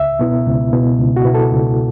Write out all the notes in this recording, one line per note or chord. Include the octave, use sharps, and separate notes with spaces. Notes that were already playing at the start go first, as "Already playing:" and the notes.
Already playing: C#2 E5
B2 B3 E4
C#2
B2 B3 E4
C#2
F#4
B2 B3 E4
A4
C#2